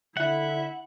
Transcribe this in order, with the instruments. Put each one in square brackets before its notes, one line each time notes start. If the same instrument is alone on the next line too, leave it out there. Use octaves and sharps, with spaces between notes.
[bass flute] D3 [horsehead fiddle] E4 [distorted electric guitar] E5 [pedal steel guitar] F#5